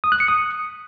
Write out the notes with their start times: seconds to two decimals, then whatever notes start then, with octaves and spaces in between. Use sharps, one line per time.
0.04 D#6
0.12 F#6
0.20 C#7
0.28 D#6